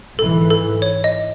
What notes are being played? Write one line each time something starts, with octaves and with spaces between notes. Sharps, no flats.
G#1 G#2 E3 A4
A4
C#5
D#5